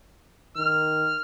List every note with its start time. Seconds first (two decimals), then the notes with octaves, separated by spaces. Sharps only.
0.56 D#3 F6